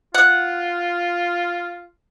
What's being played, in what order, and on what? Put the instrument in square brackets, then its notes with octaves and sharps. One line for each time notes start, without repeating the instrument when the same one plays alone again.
[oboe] F4 [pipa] F#5